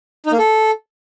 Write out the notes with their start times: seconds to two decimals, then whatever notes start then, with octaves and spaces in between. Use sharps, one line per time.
0.26 D#4
0.32 A#3
0.38 A4